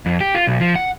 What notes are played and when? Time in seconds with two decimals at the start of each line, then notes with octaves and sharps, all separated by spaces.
0.06 F2
0.21 G4
0.35 F4
0.47 B1
0.61 F3
0.75 F#5